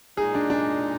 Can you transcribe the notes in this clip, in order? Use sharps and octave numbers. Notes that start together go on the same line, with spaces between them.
A#2 G#3 D#4 G#4
D4
D4